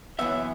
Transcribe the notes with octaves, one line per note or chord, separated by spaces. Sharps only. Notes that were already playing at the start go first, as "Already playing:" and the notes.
F#2 E3 B3 E5